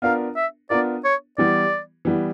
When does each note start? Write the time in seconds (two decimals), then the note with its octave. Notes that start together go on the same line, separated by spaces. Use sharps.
0.02 B3 D4 F4 A#4 F5
0.36 E5
0.70 B3 D4 F4 A#4 D5
1.04 C#5
1.38 E3 G3 B3 D5
2.05 E3 G3 B3